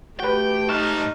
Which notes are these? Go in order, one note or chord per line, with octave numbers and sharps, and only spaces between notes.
A3 F#4 G4 B4 G5
G#2 D#4 A5 C#6 F6 F#6